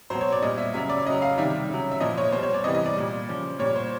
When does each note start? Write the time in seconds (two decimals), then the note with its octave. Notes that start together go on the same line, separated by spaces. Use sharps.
0.10 B2 F#3 C5
0.21 C#5
0.32 D5
0.42 A#2 G3 D#5
0.58 E5
0.74 C#3 F#3 E5
0.90 D5
1.06 C#3 F#3 D#5
1.22 F5
1.38 C3 D#3 G3 E5
1.69 C#3 F#3
1.91 E5
2.01 A#2 F3 D#5
2.18 C#5
2.32 B2 G3 C5
2.43 C#5
2.54 D5
2.64 C3 E3 G3 D#5
2.75 D#5
2.86 D5
2.96 A#2 G3
3.29 C#3 F3
3.59 A#2 G3 C#5
3.76 C5